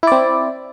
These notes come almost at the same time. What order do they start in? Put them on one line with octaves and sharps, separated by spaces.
E4 D5 C4